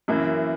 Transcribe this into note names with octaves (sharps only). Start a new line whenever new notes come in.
F#2 E3 A#3